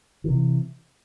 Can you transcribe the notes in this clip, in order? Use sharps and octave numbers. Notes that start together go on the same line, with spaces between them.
C3 D#3 E3